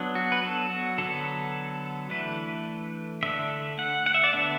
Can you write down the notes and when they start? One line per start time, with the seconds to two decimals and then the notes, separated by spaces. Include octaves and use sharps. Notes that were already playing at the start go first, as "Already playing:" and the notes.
Already playing: F#3 B3 D4
0.15 F#4
0.32 B4
0.43 A4
0.70 F#4
0.98 D3 F#3 B3 A4
2.10 E3 A3 D4 B4
3.23 D3 A3 D4 E5
3.79 F#5
4.06 F#5
4.14 E5
4.24 D5
4.33 D3 B3 D4 E5